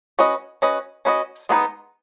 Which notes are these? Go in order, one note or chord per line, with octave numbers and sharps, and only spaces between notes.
C#4 F#4 B4 D#5
C#4 F#4 B4 D#5
C#4 F#4 B4 D#5
G#3 B3 D#4 G#4 B4